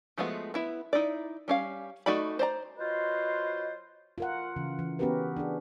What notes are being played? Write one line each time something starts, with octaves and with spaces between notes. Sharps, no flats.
F3 G#3 A3 B3 F#4
B3 E4 E5
D#4 E4 D5
G3 C#4 F5
A3 D#4 F#4 D5 B5
C5 D5 A#5
F#3 F4 F#4 B4 C5 D#5
F4 A#4 F#5
C#3 E3
E3
B3 C#4 F#4 G4 A#4 B4
D4 G#4